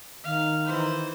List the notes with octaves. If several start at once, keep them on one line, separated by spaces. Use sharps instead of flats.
D#3 F5
E3 C5